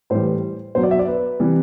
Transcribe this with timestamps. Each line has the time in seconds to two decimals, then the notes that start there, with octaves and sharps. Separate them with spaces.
0.10 A2 E3 G3 C5
0.75 B2 F#3 C5
0.83 D5
0.91 E5
0.99 D5
1.07 B4
1.40 C3 E3 G3